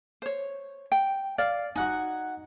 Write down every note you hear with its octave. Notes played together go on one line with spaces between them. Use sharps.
C5 C#5
G5
D5 F5
D#4 F#4 F#5 G#5